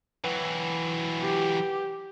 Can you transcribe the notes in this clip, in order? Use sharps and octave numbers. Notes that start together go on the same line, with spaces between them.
E3 F#3 B4 F#5 G5
G4